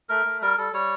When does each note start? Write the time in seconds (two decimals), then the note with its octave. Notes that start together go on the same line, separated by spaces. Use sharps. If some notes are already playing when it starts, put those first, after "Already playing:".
0.09 A3 A#4
0.26 A3
0.42 G3 A#4
0.58 G3 A4
0.73 G3 C#5